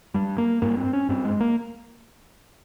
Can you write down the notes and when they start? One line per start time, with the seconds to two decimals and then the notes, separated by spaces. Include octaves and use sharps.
0.14 G2 G3
0.38 A#3
0.62 G2 A#3
0.77 C4
0.93 C#4
1.09 G2 C4
1.25 G#3
1.41 A#3